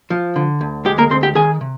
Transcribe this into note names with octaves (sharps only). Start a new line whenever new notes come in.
F3
D3
D2
G#3 G4
A#3 A#4
D2 C4 C5
G4 G5
D#3 G#4 G#5
C3